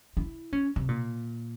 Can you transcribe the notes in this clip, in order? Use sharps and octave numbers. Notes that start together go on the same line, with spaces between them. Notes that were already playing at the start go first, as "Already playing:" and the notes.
E4
C#4
C3
A#2